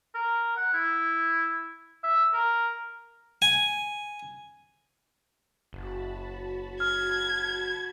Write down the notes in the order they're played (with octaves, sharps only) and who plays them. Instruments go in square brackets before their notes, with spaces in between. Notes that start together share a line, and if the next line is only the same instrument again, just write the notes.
[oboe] A#4
F#5
E4
E5
A#4
[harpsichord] G#5
[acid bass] F#1 [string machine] F#4 A5 B5
[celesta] F6 [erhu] G#6